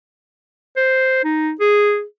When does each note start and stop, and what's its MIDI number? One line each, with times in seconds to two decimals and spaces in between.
0.77 1.22 72
1.24 1.52 63
1.60 2.04 68